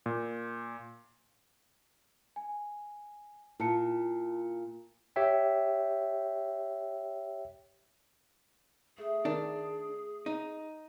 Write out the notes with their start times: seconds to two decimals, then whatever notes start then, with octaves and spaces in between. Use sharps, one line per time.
0.06 A#2
2.36 G#5
3.60 A#2 E4 A5 C#7
5.16 G4 C#5 E5 G5
8.98 A3 E4 G#4
9.25 D#3 D4
10.26 D#4